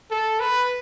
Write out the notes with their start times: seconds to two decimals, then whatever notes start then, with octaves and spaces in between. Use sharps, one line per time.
0.11 A4
0.40 B4